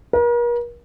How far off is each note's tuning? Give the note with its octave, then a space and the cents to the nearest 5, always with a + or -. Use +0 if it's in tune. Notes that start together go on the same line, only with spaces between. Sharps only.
A#4 +40